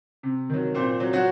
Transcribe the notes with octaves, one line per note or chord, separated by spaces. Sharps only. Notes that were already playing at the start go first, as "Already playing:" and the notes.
C3
D#3 F#3
A#2 C4 C5
F#3
F#3 F#4